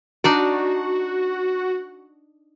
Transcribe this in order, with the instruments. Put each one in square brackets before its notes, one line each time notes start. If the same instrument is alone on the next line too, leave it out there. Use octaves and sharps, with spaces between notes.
[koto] D4 D#4 D5 [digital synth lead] F#4